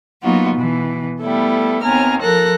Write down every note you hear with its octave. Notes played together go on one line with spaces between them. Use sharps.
F#3 A#3 B3 D#4 F4 F#4
B2 E3
G3 A3 B3 E4 A4
D#2 B3 C4 G#5 A#5 F6
F3 A4 A#4 F#6 A#6